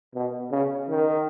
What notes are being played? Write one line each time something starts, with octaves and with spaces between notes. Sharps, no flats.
B2
C#3
D#3